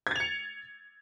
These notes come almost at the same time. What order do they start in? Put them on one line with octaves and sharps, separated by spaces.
G#6 A6 F7 C#7